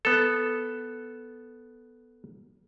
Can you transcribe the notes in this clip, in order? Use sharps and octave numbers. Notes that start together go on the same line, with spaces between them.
B3 A4